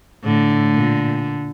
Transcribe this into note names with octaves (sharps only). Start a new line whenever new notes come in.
A2 D3
A#2